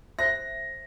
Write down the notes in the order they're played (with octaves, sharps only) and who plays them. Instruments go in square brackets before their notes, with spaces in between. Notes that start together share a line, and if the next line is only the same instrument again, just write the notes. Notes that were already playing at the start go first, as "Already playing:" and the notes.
[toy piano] C5 E5 [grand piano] A#6